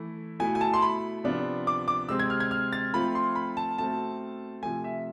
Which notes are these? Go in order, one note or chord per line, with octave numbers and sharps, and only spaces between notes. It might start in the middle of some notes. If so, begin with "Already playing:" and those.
Already playing: E3 A3 E4
B2 A3 E4 G#5
G#5
A5
C6
B5
C3 F3 B3 D4 F4
D6
D6
C3 G#3 C4 E6
G#6
F6
G#6
F6
A6
F3 A3 C4 F4 B5
C6
B5
A5
B2 A3 C4 A5
C3 F3 A3 G#5
E5